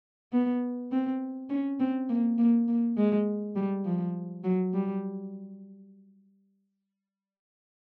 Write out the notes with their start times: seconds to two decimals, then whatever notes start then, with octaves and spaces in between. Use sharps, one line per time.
0.32 B3
0.92 C4
1.50 C#4
1.80 C4
2.09 A#3
2.38 A#3
2.68 A#3
2.97 G#3
3.56 G3
3.85 F3
4.44 F#3
4.73 G3